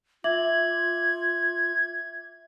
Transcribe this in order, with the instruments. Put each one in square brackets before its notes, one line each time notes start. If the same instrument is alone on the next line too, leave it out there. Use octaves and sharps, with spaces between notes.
[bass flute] F4 [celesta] E5 D6 F#7 [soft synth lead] G#6